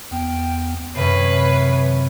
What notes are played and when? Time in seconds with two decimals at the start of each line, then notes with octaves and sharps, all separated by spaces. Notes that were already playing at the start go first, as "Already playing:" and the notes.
0.11 E2 B3 G5
0.95 F#2 C3 D#3 B4 C#5 E5 C7